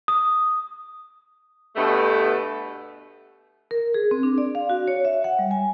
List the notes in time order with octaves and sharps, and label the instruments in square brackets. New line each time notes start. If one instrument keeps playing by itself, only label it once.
[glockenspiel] D#6
[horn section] G2 B2 A3
[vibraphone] A#4
G#4
C4
D4
D5
F5
F#4
C#5
E5
F#5
G3
G#5